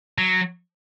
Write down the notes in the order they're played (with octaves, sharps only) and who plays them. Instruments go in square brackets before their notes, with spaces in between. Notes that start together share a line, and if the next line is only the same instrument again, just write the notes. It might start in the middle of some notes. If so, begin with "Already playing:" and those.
[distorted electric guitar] F#3